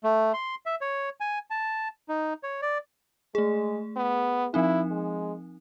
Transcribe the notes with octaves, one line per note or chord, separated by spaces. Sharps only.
A3
C6
E5
C#5
G#5
A5
D#4
C#5
D5
G#3 A3 G#4
B3
F3 C4 D#4 E4
G#3